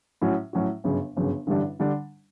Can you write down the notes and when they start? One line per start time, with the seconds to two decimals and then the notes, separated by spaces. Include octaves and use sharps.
0.22 A2 F#3 C#4 F#4
0.53 A2 F#3 C#4 F#4
0.84 G1 F#2 C#3
1.17 G1 F#2 C#3
1.47 A1 G2 D3 G3 D4
1.80 D3 G3 D4